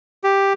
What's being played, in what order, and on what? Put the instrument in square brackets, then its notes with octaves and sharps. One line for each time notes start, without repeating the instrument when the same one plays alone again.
[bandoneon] G4